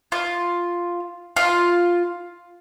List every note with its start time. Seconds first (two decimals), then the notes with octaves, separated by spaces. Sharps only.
0.12 F4
1.36 F4